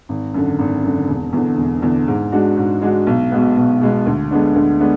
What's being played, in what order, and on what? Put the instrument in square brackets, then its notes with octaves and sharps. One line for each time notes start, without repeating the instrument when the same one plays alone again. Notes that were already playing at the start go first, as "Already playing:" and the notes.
[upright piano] G#1
F#2 D3
G#1
F#2 D3
E1
E2 D3
E1
E2 D3
G#2
G#3 D4 F#4
G#2
G#3 D4 F#4
B1
B2 G#3 B3
B1
B2 G#3 B3
D2
D3 G#3 B3 D4
D2
D3 G#3 B3 D4